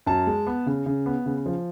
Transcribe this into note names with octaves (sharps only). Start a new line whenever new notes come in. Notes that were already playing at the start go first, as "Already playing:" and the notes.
F#2 A5
G#3
B3
C#3
C#3
B3
C#3
F3